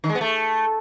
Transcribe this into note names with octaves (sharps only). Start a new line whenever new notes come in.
D#3
G#3
B3
A3